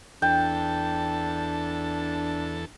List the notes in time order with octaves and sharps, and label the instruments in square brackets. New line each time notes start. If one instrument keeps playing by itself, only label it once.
[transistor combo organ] E2 A4 [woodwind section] D4 [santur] G5